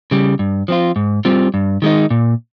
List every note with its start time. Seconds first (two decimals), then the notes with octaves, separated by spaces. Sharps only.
0.11 C#3 G3
0.39 G2
0.68 F3 C4 F4
0.96 G#2
1.25 G3 C4 F4
1.54 G2
1.82 D#3 G#3 D#4
2.10 A#2